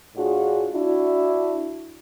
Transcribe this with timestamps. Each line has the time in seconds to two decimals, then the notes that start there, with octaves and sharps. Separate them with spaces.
0.16 A2 D4 F4 F#4 G#4
0.74 D4 E4 F#4